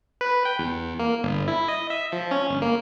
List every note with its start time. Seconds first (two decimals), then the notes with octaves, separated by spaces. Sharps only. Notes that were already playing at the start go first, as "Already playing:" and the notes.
0.21 B4
0.45 G5
0.59 E2
0.99 A#3
1.23 G1
1.48 E4
1.68 D#5
1.90 E5
2.12 F3
2.31 C#4
2.49 G1
2.62 A#3